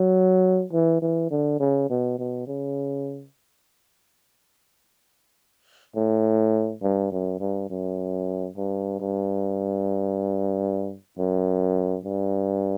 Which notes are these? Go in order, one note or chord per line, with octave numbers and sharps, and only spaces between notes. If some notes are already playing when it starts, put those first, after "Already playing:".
Already playing: F#3
E3
E3
D3
C#3
B2
B2
C#3
A2
G2
F#2
G2
F#2
G2
G2
F#2
G2